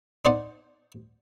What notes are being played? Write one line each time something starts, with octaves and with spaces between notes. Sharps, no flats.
D4 D#4 C5 D5 F#5